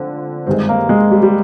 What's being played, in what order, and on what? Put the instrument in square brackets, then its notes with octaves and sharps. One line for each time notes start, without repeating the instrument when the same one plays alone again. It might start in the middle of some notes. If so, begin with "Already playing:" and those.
Already playing: [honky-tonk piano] D3 F3 C4 F4
[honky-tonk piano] G#1 G2 D#3 G#3 [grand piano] C4
[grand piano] A#3
G#3
G3
G3